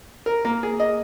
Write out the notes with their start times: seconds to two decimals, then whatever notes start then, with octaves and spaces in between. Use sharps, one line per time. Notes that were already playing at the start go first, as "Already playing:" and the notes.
0.26 A#4
0.45 A#3
0.63 G#4
0.80 D#5